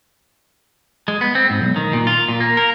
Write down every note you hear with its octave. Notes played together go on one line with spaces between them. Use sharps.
G#3
B3
C4
G#2
B1
D#3
A#2
F4
A#2
A#3
A#4